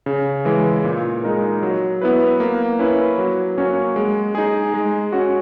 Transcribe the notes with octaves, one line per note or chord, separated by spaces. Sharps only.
C#3
E3 G#3
A#2
G#3 D#4 A#4
F#3
B3 E4 B4
A#3
C#4 E4 B4
F#3
A#3 C#4 F#4 C#5
G#3
D#4 G#4
G#3
C#4 F#4